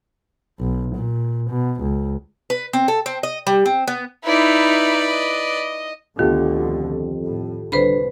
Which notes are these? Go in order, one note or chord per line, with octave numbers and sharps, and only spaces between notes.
B1
A#2
B2
C#2
B4
C4
A4
C4
D#5
G3
C4
B3
D#4 E4 B4 D5
D#5
D2 B2 D3 D#3 B3 F4 G4 A4
F2
A2
C2 D3 B4 C5 B5